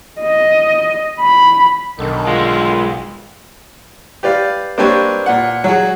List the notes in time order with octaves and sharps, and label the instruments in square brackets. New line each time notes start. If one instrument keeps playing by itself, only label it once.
[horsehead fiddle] D#5
B5
[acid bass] B1 [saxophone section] D3 D#3
[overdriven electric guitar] G#3 F4
[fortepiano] G4 B4 D5 F5
A#3 C4 D4 G4 B4 C#5
A#2 F#5
F#3 F#4 G#4